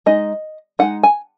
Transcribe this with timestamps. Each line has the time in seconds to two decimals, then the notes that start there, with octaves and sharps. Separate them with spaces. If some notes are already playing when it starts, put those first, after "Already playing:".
0.06 G#3 D#4 D#5
0.79 G#3 D#4 F#5
1.03 G#5